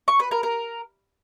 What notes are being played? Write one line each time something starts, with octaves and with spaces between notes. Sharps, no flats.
C#6
B4
A#4
A#4